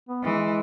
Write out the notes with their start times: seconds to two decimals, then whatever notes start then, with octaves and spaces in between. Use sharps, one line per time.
0.09 B3
0.23 E3 G#3